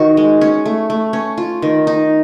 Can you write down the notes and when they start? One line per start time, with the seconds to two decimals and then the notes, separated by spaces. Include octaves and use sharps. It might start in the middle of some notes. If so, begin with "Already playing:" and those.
Already playing: D#3 F#4
0.17 G#3
0.41 C#4
0.66 A3
0.90 A3
1.13 C#4
1.38 F4
1.62 D#3
1.87 D#4